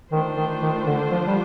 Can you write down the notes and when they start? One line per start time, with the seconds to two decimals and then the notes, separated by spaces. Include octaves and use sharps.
0.12 D#3 A3 D4 F4 C5
0.37 D#3
0.62 D#3
0.87 D3
1.11 F3
1.27 G3